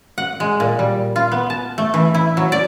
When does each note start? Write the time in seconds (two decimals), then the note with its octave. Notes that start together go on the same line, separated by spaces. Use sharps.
0.18 F#5
0.40 G#3
0.60 A#2
0.79 G3
1.16 F4
1.32 B3
1.50 A5
1.78 A3
1.94 E3
2.14 E4
2.37 F#3
2.52 D5